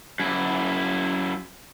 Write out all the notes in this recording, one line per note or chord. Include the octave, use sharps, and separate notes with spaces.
F#2 E4